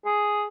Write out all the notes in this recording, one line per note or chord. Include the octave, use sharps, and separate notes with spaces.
G#4